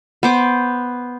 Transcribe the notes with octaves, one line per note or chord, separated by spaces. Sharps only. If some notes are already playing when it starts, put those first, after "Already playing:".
B3 C5 D6